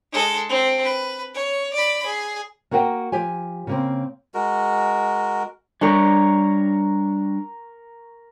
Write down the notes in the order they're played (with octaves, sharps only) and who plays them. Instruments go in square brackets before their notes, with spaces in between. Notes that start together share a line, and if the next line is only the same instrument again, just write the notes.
[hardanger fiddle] G#3 A4
C4
B4
C#5
D5 B5
G#4
[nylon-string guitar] A#3 F#4 A#4 F#5 G5
F3 G4 G#5
C#3 A#3 C4
[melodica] G#3 F#4 A#4
[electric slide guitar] G3 D4 C#5 [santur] A#4 C#6